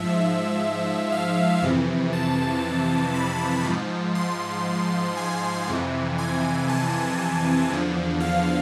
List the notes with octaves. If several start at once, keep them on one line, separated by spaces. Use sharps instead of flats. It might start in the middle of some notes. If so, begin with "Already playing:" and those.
Already playing: G#2 F3 E5
F5
F2 C3 E3
A5
B5
G#2 F3
C6
G#5
F2 C3 E3
G#5
A5
G#5
E2 D3 F3
F5